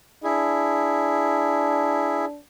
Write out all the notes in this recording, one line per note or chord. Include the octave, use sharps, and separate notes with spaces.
D4 E4 G#4